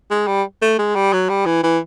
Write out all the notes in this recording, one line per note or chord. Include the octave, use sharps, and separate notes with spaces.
G#3
G3
A3
G#3
G3
F#3
G3
E3
E3